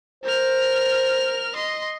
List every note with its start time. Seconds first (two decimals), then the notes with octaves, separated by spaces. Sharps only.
0.24 A#4 C5 F6
1.55 D#5 C6